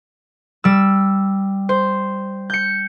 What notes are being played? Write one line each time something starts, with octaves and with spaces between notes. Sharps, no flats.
G3 E6
C5
G6 C#7